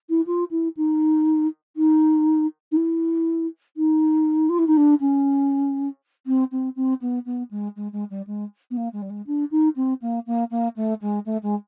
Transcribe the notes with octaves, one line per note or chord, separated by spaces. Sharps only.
E4
F4
E4
D#4
D#4
D#4
E4
D#4
F4
E4
D#4
D4
C#4
C4
C4
C4
B3
B3
G#3
G#3
G#3
G3
G#3
B3
A#3
G#3
G3
G#3
D4
D#4
C4
A#3
A#3
A#3
A3
G#3
A3
G#3